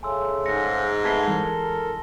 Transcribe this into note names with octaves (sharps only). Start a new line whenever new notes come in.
C#3 A3 G#5 C6 E6
G#2 A#6 C#7
A3 B3 A5 G#6 B6 C7 G7
E3 G#3 A4 A#4